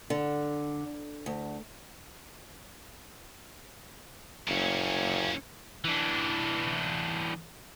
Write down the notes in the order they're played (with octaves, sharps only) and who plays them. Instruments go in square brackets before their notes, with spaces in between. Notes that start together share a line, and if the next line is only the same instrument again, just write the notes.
[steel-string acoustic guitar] D3
D2
[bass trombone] F#1 [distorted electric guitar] A#2 C#4
[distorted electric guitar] E3 D4